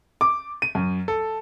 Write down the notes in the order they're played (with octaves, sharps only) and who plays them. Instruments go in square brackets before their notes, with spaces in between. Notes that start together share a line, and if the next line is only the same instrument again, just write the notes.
[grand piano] D6
D#7
F#2
A4